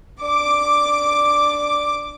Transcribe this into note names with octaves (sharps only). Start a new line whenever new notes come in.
D4 D6